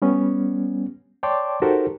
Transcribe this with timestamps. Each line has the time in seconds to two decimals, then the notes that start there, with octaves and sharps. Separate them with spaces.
0.02 G3 B3 C#4
1.23 C#5 D5 G5 A5 C6 D6
1.62 D#4 F#4 G4 A4 A#4 C5